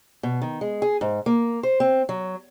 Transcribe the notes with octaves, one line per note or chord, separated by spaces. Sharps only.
B2
D#3
G#3
G#4
G#2
A#3
C5
C4
F#3